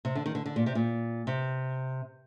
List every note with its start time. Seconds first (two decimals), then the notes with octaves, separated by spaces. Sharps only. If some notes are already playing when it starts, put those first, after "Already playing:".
0.05 C3
0.15 D3
0.26 D#3
0.35 D3
0.46 D3
0.56 A#2
0.66 C3
0.75 A#2
1.27 C3